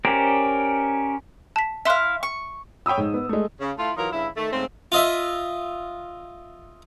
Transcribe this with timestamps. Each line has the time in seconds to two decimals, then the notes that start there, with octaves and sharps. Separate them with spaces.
0.05 C#4 G4 A#4 C5 D5
1.56 A5 B6
1.85 E4 E5 F5 C6 F#6
2.23 C#6
2.86 C#5 G5 B5 D#6 E6
2.98 G#2
3.14 B3
3.29 G#3 A3
3.61 C#3
3.78 A3 E4 F4
3.96 E3 F#3 D#4 F4 A#4
4.12 G2 C#3 E4
4.36 D#3 A3
4.51 G#2 C#3 A3 C4
4.92 F4 D#5 E5